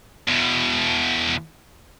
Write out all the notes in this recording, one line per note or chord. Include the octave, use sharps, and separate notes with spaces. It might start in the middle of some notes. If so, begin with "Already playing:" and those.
E2 B2